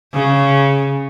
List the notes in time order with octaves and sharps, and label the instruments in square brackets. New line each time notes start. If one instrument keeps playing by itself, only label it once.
[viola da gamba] C#3